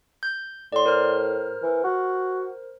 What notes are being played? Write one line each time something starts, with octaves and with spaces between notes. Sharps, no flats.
G6
A2 D5 C6
A#4 C5 F6
E3
F#4